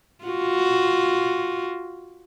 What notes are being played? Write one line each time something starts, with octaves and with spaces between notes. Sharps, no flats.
F4 F#4